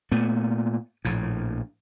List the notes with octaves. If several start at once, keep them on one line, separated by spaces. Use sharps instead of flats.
A#2 A3 B3
A#1 A2